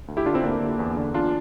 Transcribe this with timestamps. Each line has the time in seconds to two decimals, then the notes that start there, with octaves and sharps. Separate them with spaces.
0.08 D2
0.17 E4 G4
0.26 D3 D4 F4
0.34 C4 E4
0.44 D2 A#3 D4
0.61 D3
0.79 E2
0.97 D3
1.14 E2 D4 F4